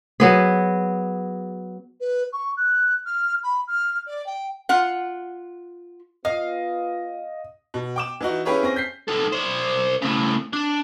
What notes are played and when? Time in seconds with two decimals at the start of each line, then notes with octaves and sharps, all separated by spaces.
0.20 F#3 B3 G#4
2.01 B4
2.33 C#6
2.57 F#6
3.06 F6
3.44 B5
3.68 F6
4.07 D5
4.27 G5
4.69 F4 F#5
6.25 B3 F4 D#5 F5
7.74 B2
7.96 G5 D6 E7
8.21 E3 D#4 F#4
8.45 C#4 E4 G4 G#4 B4 C#5
8.63 C4 C#4 A#6
8.76 G6 B6 C7
9.08 D#4 A4
9.32 C5 D5
10.02 A2 C#3
10.53 D4